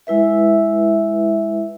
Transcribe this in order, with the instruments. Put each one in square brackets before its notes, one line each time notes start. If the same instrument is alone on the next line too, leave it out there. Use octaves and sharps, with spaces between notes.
[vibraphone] G#3 E4 B4 E5